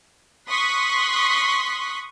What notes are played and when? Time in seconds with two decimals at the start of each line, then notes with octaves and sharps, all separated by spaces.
0.49 C6 C#6 D#6 F#6 B6